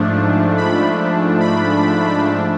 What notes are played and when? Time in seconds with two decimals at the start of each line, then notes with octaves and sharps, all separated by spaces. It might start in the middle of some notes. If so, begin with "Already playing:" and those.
Already playing: G#2 F3 A3 D4
0.58 B5
1.40 B5